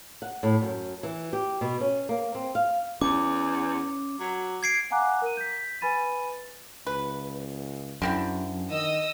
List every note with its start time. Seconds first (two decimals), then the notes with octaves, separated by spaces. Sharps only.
0.22 F#5
0.43 A2
0.62 F#2
1.03 E3
1.33 G4
1.61 B2
1.81 C#4
2.09 A#3
2.35 C4
2.55 F5
3.01 E2 C#4 D6
4.20 F#3
4.63 G#6 C7 D7
4.90 F5 F#5 G#5 A#5 D6 F#6
5.22 A#4 D#7
5.37 G6 B6
5.81 B4 G#5 B5 A6 D#7
6.87 C#2 B4
8.02 F#2 D3 C4 E4
8.71 D#3 D#5 D#6 E6